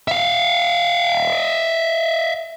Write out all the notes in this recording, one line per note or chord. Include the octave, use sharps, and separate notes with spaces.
E5 F5